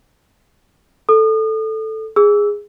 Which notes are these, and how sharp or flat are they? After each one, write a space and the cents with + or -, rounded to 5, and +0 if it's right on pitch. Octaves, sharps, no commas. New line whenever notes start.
A4 +0 D#6 -40
G#4 -10 E6 +0